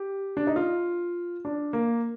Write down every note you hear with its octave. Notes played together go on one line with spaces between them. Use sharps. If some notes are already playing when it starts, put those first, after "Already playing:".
Already playing: G4
D4
D#4
F4
D4
A#3